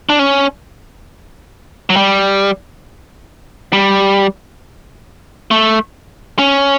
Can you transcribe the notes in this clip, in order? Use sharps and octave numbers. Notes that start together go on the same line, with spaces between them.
D4
C#4
F#3
G3
G3
A3
C#4